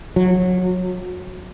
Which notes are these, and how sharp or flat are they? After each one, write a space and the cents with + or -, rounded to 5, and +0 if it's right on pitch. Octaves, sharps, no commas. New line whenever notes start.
F#3 -20